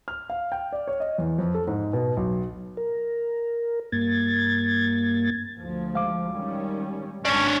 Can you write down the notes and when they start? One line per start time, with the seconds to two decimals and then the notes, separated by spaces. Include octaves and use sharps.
0.08 F6
0.30 F5
0.52 G5
0.72 D5
0.88 C#5
1.00 D#5
1.18 E2
1.38 F2
1.54 A4
1.67 G#2
1.93 B2
2.17 B1
2.77 A#4
3.92 G2 A#3 G#6 A6
5.57 D2 F3
5.94 G#3 F5 D6
6.31 D#3 G3 C#4
7.25 G#1 G#3 C#4 D4 C#5